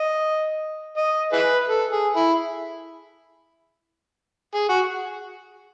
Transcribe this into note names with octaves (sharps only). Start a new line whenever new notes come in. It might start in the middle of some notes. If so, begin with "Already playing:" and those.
Already playing: D#5
D#5
E4 G#4 B4
A4
G#4
E4
G#4
F#4